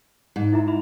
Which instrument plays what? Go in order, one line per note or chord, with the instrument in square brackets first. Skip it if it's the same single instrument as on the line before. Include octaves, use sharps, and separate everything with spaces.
[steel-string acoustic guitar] G#2
[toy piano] E4 E5 A#5
E5 B5